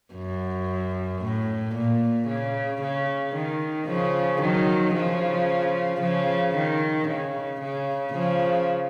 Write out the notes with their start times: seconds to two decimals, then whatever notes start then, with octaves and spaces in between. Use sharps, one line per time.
0.14 F#2
1.21 A2
1.74 A#2
2.27 C#3
2.81 C#3
3.34 D#3
3.87 C#3 F3
4.40 D#3 F#3
4.94 C#3 F3
6.00 C#3 F3
6.54 D#3
7.07 C#3
7.60 C#3
8.13 C#3 F3